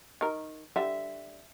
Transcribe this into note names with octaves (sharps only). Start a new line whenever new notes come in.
D#3 A#4
D3 G3 E5